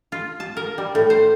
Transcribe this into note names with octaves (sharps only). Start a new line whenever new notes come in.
F4
A5
A#4
G3
A2
C5